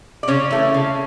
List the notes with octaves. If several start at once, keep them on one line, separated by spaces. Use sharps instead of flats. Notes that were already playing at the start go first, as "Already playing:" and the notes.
D5
C#3 C#4 C#5
E3 A3
C#3